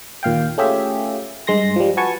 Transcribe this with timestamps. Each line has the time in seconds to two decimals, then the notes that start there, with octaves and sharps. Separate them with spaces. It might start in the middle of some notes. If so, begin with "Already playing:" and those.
0.23 D#2 A#2 F5 G5
0.58 A3 C#4 F4 G4 G#4 E5
1.47 G2 G#3 C6 A#6
1.76 F3 G3
1.97 F#4 B4 F#5 G#5 A5 C#6